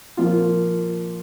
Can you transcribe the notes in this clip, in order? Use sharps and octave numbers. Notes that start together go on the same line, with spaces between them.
A#2 F3 A#3 F4